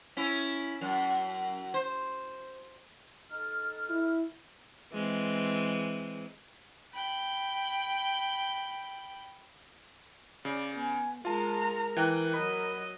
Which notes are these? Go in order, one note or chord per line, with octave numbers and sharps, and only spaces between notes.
C#4 E4
F#2
C5
D#4 A4 F6
E4
E3 G#3 C4
G5 B5
C#3 D5
B3 G#5
G#3 F4 A#4 A5 A#5
E3 G5 F#6
F#3 D#5 B5